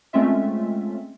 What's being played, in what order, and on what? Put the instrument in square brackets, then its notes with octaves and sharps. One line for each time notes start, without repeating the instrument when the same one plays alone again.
[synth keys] G#3 A3 C4 C#4 F4 E5